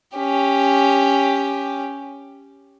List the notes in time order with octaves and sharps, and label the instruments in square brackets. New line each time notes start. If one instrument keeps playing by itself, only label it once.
[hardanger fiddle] C#4 G4